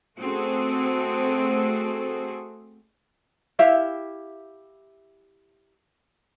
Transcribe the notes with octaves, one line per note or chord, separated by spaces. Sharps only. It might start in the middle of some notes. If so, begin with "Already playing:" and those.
A3 C4 F#4 G#4 A4
E4 G4 E5 F5